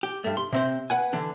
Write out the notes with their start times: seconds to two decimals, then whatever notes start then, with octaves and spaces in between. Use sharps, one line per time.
0.03 G4
0.24 G2 A3
0.37 C6
0.53 C3 C4 C5
0.90 B4 F#5 G#5
1.13 D3 E3 D4